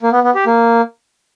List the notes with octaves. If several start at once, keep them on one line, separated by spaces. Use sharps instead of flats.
A#3
B3
B3
G4
A#3